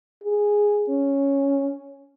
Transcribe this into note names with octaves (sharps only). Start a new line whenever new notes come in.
G#4
C#4